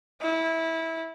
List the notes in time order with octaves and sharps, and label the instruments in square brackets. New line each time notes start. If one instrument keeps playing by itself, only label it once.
[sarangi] E4